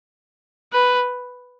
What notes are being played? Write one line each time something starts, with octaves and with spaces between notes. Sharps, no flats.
B4